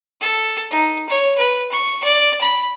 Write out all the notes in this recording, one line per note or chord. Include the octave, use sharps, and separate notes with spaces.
A4
D#4
C#5
B4
C#6
D5
B5